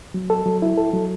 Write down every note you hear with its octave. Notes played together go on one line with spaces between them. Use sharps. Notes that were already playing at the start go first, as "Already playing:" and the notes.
F#3
A4
F#3
E4
A4
F#3